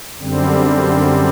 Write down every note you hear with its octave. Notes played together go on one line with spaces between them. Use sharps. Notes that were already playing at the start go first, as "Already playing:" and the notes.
F#2 D3 G3 C4